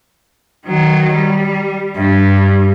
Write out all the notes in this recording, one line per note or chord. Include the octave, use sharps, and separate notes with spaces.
D#3 F#3
G3
G2